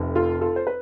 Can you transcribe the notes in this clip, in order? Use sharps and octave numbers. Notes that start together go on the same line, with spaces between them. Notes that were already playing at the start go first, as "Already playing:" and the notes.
Already playing: F1 F2 C3
F4 A4
F4 A4
C5
B4